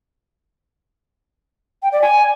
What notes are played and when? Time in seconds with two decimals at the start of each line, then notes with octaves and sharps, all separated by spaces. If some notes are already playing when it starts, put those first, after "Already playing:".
1.82 G5
1.92 D5
2.01 G#5